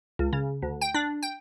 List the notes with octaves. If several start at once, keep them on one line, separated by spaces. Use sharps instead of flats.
C#2
C#3
D2
G5
D4
G5